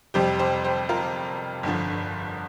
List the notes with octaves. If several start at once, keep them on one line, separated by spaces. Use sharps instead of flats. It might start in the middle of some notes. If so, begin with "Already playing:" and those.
F2 C3 G3 G4 C5
G4 C5
G4 C5
F4 A#4
G1 G2 D3 F3